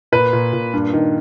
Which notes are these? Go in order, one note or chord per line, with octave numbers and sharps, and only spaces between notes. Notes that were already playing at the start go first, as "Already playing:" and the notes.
A#2 B4
A#2
A#2
G2
D#3